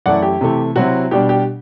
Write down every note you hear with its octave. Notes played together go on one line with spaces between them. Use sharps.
F#2 E3 A3 E4 D5 F#5
G4
C3 E3 A3
C3 F#3 C4 E4 F#4
B2 G3 D4 G4
G4